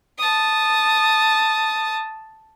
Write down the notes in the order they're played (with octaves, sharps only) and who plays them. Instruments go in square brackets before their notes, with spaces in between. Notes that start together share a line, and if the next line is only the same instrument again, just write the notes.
[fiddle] A5 D#6